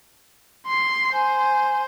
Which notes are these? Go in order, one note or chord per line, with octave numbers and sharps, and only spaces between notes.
C6 C7
C5 G#5